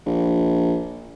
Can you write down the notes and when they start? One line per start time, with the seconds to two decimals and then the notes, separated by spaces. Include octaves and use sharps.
0.06 A#1